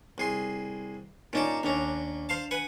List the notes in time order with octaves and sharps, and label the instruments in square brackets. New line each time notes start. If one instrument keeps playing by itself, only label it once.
[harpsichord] C2 G#4 C6
[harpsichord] A#2 C#4 A5 [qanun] D#4 D5
[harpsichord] D#2 C#4 [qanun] D4 A#5
[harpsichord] C5 F5 A5
B4 F#5 G#5